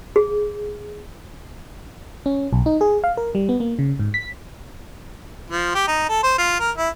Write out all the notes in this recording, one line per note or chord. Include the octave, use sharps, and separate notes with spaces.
G#4
C#4
B1
D#4
G#4
F5
A#4
G3
B3
A#3
C#3
G#2
B6
F3
G4
D#4
A4
C5
F4
A#4
E4